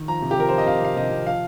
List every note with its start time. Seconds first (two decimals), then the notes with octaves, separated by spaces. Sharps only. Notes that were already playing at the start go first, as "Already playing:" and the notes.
Already playing: D#3
0.08 F3 A#5
0.22 C3
0.31 G4
0.37 F3 A#4
0.49 F3 C5
0.58 D#5
0.66 C3 F5
0.82 C3 F5
0.96 C3 D#5
1.11 C3
1.26 F3 F5